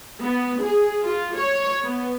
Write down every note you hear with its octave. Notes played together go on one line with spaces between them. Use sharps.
B3
G#4
F4
C#5
B3